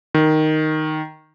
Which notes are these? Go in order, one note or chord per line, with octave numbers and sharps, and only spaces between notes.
D#3